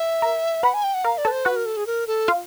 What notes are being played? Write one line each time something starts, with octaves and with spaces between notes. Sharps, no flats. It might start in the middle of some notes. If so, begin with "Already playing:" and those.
Already playing: E5
A#4 A#5
B4 F#5 B5
G#5
G5
F#5
A#4 F5 A#5
D5
A4 B4 A5
C5
F#4 B4 F#5
A#4
A4
G#4
A#4
A4
F4 F5